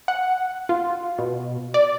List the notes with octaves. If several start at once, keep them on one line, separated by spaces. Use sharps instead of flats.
F#5
F4
B2
D5